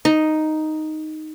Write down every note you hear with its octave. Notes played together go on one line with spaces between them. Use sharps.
D#4